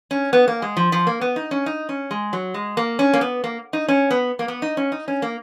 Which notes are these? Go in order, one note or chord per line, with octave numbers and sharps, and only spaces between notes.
C#4
B3
A#3
G#3
F3
F3
A#3
B3
D#4
C#4
D#4
C#4
G#3
F#3
G#3
A#3
C#4
A#3
B3
A#3
D#4
C#4
B3
A#3
B3
D#4
C#4
D#4
C#4
A#3